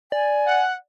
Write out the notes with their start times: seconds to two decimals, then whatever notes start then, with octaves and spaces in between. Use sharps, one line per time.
0.12 D5 G#5
0.46 F#5